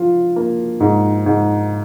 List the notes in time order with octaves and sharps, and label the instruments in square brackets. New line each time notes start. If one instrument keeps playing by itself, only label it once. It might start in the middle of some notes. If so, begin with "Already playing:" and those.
Already playing: [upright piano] F3 F4
A#3
G#2
G#2